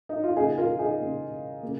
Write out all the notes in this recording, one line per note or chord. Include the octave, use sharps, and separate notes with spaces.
D#4
F4
C#3 A#3 D#4 G#4
F4 A#4
D#4 G#4
C#3 A#3
C#3 A#3